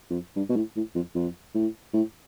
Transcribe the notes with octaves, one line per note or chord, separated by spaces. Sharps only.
F2
G2
B2
A2
A2
F2
F2
A2
A2